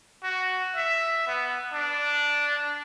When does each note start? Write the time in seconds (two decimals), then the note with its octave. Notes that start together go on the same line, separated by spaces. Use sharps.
0.23 F#4
0.76 E5
1.27 B3
1.74 D4